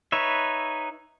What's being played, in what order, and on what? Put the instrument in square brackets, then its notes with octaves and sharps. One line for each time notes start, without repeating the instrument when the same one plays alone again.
[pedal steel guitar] D#4 B4 C#5 E5